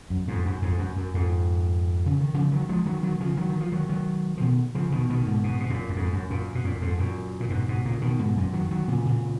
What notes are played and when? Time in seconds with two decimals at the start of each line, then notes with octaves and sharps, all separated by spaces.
0.10 F#2
0.28 F2 G#2
0.46 F#2
0.62 F2 G#2
0.79 F#2
0.97 F#2
1.14 F2 G#2
2.06 C#3
2.20 D#3
2.34 C#3 F3
2.52 D#3 F#3
2.69 F3 G#3
2.86 D#3 F#3
3.03 D#3 F#3
3.20 C#3 F3
3.37 D#3 F#3
3.49 D#3
3.61 F3
3.72 D#3 F#3
3.89 D#3 F#3
4.37 F3
4.40 B2 D#3
4.75 C#3 F3
4.92 B2 D#3
5.10 B2 D#3
5.26 G#2 B2
5.44 G#2 B2
5.60 B2
5.70 F#2 A#2
5.89 F#2
5.96 F2 G#2
6.13 F#2
6.30 F#2 A#2
6.55 B2
6.64 F#2 A#2
6.81 F2 G#2
6.99 F#2 A#2
7.40 A#2
7.50 G#2 B2
7.68 G#2 B2
7.85 A#2 C#3
8.02 B2 D#3
8.19 G#2 B2
8.37 F#2 A#2
8.53 D#3 F#3
8.71 D#3 F#3
8.88 A#2 C#3
9.05 A#2 C#3